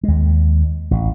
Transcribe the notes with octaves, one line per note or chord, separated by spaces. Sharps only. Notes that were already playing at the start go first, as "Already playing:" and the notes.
D#2 G#3
A1